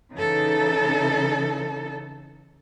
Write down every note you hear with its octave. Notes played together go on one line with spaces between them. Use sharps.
C#3 E3 D#4 A4